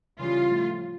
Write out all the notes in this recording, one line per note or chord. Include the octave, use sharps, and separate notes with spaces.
C#3 E3 G3 F4
A2 F3